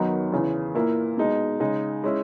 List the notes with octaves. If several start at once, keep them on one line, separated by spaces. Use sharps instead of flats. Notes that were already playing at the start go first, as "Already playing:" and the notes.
Already playing: F#2 D#3 F#3 B3 D#4
E2 C#3 E3
A#2 A#3 E4
B2 G#3 D#4
C#3 G#3 D#4
G#3 C#4 E4